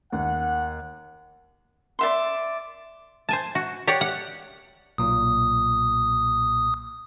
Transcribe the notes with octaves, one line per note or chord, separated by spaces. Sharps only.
D#2 F#5
D5 E5 C6
C5 G#5 A5
F#4
G4 C#5 D5 F#5
F#5
B1 A#2 D#6